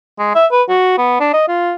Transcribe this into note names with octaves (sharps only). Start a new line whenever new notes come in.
G#3
E5
B4
F#4
B3
D4
D#5
F4